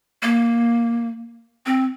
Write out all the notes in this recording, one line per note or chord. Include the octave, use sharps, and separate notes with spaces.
A#3
C4